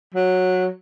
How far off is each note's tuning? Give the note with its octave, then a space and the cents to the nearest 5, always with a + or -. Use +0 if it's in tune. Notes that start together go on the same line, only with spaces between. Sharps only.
F#3 -10